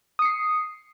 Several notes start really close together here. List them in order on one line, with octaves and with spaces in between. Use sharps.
D#6 C#7 C7